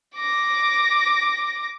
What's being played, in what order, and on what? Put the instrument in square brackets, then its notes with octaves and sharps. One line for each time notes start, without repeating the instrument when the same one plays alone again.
[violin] D6 A#6